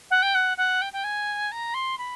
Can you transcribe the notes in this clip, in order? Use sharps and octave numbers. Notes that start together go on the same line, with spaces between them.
F#5
G5
F#5
F#5
G5
G5
G#5
A#5
C6
B5